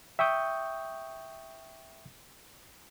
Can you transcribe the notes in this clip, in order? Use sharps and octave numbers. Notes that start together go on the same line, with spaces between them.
E5 G5 C#6 D#6 G6